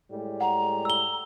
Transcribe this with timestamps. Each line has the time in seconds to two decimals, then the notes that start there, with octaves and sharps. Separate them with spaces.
0.11 A2 G3 G#3
0.41 F#5 A#5
0.85 E6 G7